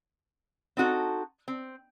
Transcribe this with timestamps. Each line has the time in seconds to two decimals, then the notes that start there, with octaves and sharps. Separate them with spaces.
0.77 C4 D#4 F#4 A4
1.48 C4